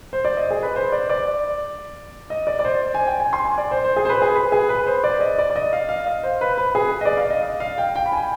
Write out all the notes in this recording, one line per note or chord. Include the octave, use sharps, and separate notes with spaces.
C5
D5
D#5
G#4
B4
C5
D5
D5
D#5
D5
D5
C5
G#5
G5
G#5
C6
G#5
D5
C5
C5
G#4
C5
B4
G#4
B4
G#4
B4
C5
D5
D#5
D5
D5
D#5
F5
F5
D#5
C5
B4
B4
G#4
D#5
D5
F5
D#5
D#5
F5
G5
G5
B5
G#5